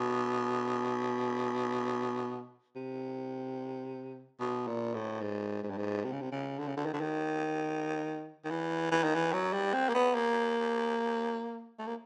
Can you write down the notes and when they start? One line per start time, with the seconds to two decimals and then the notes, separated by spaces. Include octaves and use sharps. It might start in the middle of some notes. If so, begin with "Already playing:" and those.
Already playing: B2
2.76 C3
4.40 B2
4.67 A#2
4.94 A2
5.22 G#2
5.63 G#2
5.70 G2
5.78 G#2
6.04 C3
6.12 C#3
6.21 C3
6.32 C#3
6.59 D3
6.68 C#3
6.77 D3
6.86 D#3
6.93 D3
7.01 D#3
8.45 D#3
8.51 E3
8.91 E3
9.04 D#3
9.15 E3
9.33 F#3
9.53 G3
9.74 C4
9.89 A#3
9.95 B3
10.15 A#3
11.79 A3
11.87 A#3